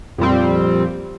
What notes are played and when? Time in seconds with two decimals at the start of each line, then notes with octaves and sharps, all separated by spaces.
0.18 F2 A#2 G3 C4